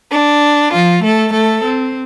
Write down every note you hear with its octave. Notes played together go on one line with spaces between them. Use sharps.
D4
F3 F4
A3 A4
A3 A4
C4